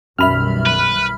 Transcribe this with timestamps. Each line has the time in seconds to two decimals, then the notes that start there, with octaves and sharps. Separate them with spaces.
0.18 B1 F#2 D#3 G3 E5 B5 F6 F7
0.66 B4